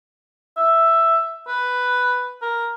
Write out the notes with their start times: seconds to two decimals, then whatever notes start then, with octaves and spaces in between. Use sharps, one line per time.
0.57 E5
1.47 B4
2.42 A#4